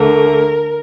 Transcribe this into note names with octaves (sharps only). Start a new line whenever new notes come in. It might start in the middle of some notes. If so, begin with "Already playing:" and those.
Already playing: D2 D3 A3 A#4